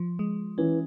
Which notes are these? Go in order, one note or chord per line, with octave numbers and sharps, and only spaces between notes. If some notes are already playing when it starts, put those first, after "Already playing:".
Already playing: F3
G#3
E3 C#4